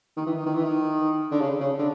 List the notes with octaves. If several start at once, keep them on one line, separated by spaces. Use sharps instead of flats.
D#3
E3
D#3
D#3
E3
D#3
D3
C#3
C#3
D3